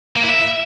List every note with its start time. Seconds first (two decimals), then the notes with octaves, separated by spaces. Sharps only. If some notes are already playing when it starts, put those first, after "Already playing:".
0.17 A#3
0.23 E4
0.30 E5